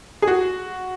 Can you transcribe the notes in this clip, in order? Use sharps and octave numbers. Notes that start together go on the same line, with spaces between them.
G#4
F#4